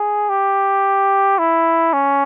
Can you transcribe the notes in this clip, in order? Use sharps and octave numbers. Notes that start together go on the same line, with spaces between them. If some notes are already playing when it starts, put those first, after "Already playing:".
Already playing: G#4
G4
E4
C#4